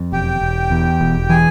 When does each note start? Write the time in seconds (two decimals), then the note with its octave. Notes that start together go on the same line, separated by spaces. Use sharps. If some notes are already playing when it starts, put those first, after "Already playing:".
Already playing: F2
0.12 E1 G4 G5
0.41 E1
0.71 E2
1.01 E1
1.29 E3 G#4 G#5